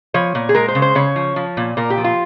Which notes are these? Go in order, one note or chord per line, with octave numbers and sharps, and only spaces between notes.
F3 C#5
A#2
G#4
G#3 A#4
C5
C#3
C5
C#3 C#5
F3
F3
A#2
A#2 A#4
G4
F3
F4